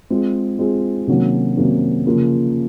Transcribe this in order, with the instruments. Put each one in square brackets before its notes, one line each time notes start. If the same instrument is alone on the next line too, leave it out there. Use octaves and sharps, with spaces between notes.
[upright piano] G#3 C4 F4 G#4
G#3 C4 F4 G#4
C3 D#3 F#3 A#3 C#4
C3 D#3 F#3 A#3 C#4
C#3 F3 A#3 F4 G#4